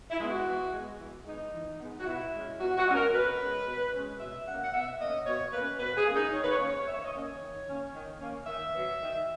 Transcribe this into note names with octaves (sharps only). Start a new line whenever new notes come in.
E4
G#3 B3
F#4
E3
G#3 B3
E3
G#3 B3 D#4
E3
G#3 B3
F#4
B2 E4
G#3 C#4
B2 F#4
F#4
G#3 C#4
A#4
B2 B4
G#3 C#4
B2
G#3 C#4
B2 E5
A#3 C#4 F#5
F#5
B2 E5
A#3 C#4 D#5
B2 C#5
A#3 C#4 B4
B2 B4
G#4
A#3 C#4
D#4
D#3 C#5
B4
C#5
A#3 C#4
C#5
D#3 E5
C#5
D#5
A#3 C#4
C#5
D#3
A#3 C#4
D#3
A#3 C#4
D#3 E5
F#3 B3
D#3